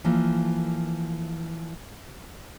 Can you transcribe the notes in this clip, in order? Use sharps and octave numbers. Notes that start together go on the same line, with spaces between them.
E3 F3 A#3 A4